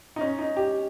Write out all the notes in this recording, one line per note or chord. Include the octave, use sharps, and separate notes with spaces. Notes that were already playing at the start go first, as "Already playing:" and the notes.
D#4
C#4
D#4
G4